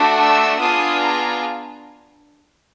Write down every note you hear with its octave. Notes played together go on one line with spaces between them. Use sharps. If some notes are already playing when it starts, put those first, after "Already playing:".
Already playing: A3 D4 F#4
E6
B3 D4 F4 G#4 D#6
A#5